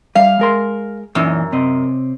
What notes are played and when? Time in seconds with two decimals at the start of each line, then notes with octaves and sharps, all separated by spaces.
0.15 G3 F5
0.39 G#3 A#4 C6
1.15 F#2 A#2 E3 D#4
1.52 C3 C4 D#5